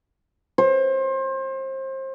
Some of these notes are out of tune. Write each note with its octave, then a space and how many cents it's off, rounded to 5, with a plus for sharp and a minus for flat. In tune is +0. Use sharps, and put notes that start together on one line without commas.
C5 +30